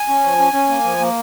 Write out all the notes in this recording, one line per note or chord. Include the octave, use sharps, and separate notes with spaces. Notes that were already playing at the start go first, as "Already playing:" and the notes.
Already playing: G#5
C#4
F3
C#4
C#4
A#3
F3
A#3